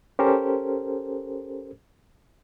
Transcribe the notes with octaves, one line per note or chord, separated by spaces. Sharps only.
C#4 G4 A4 A#4 C5